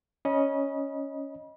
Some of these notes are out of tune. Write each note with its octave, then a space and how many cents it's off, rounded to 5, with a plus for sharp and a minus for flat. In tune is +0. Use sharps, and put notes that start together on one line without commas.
C#4 +0 D#5 +0 B5 -35